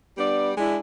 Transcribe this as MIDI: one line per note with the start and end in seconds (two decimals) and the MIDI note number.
0.18 0.52 55
0.18 0.52 59
0.18 0.52 62
0.18 0.52 74
0.58 0.77 56
0.58 0.77 62
0.58 0.77 64